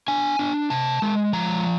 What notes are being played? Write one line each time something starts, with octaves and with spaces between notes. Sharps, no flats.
D4 G#5
D4
C3 A5
G#3
F3 A#5